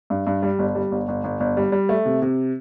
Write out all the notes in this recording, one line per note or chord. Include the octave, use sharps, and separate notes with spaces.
G2
G2
G3
G1
G3
G1
G1
G1
G1
G3
G3
A3
C3
C3